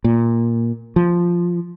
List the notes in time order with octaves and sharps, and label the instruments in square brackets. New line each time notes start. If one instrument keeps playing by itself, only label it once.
[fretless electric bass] A#2
F3